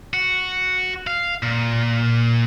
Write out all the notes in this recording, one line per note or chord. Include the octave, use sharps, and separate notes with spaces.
F#4
F5
A#2